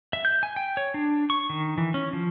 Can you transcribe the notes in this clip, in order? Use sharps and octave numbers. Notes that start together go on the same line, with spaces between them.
E5
G6
G#5
G5
C#5
D4
C#6
D#3
E3
C#4
F3